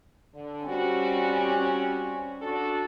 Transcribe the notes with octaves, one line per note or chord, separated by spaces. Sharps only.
D3
G3 C4 C#4 F#4
D4 F#4 A4